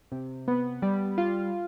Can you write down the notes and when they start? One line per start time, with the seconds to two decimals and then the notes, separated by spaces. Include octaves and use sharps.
0.12 C3
0.48 B3
0.82 G3
1.18 F4